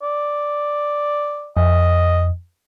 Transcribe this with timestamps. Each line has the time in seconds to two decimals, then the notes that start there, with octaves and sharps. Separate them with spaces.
0.02 D5
1.57 F2 D#5